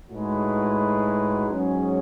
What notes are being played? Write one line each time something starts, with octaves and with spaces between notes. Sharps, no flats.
A2 G#3 D#4 F#4 B4
G#2 F#3 C#4 G#4